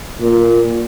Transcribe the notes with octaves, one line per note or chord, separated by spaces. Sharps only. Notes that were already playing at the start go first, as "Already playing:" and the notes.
A#2